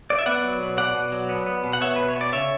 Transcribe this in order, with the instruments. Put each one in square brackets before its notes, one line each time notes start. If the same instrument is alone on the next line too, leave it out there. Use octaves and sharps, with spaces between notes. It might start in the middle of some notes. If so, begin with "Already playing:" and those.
[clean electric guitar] D5
E5
B3 D5 F#5
F#3
B2
B2 D5 F#5
B2
F#3
B3
B3
B2
F#5
B3 C#5 E5
B2 B4
C#5
B3
D5
C#3 C#5 E5